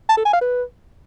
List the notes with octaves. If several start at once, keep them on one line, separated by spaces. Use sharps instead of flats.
A5
A4
G#5
F5
B4